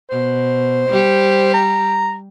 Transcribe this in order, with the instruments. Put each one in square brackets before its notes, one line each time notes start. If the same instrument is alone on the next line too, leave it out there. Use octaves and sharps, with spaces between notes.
[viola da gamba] B2 [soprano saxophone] C5
[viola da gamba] G3 G4
[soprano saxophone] A#5